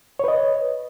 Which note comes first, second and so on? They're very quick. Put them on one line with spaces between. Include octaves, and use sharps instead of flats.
C#5 B4 D#5